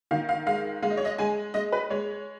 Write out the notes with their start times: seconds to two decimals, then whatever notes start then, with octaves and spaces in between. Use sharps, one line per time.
0.11 D#3 F5
0.29 F5
0.46 G#3 F5
0.82 G#3 F5
0.90 D#5
0.97 C#5
1.05 D#5
1.18 G#3 G#5
1.54 G#3 D#5
1.72 B4
1.90 G#3 C#5